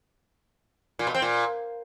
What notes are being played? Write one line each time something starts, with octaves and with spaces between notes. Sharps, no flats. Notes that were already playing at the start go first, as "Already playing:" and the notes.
A#2
B2
C4
A#2